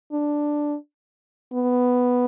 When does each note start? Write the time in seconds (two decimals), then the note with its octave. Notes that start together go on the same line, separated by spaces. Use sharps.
0.12 D4
1.54 B3